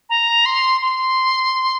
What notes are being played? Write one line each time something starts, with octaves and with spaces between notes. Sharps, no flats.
A#5
C6
C6